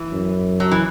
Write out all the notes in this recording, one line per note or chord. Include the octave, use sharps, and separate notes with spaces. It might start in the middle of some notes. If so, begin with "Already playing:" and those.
Already playing: E3
F#2
F#3
E3